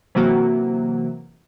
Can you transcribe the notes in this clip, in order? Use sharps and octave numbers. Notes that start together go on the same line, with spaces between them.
C3 E3 F#3 A#3 F#4